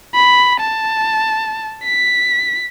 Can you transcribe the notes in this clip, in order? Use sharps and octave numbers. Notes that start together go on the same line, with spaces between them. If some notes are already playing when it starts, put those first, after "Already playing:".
B5
A5
B6